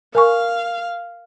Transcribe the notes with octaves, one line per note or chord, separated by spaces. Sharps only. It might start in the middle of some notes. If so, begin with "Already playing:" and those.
A#4 F5 G#5 C#6